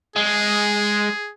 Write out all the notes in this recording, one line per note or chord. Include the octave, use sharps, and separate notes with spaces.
G#3 G#4